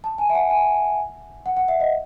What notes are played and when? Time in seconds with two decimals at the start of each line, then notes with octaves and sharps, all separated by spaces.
0.04 A5
0.18 G#5
0.30 E5
0.35 F#5
0.50 G#5
1.46 F#5
1.57 F#5
1.68 E5
1.80 D#5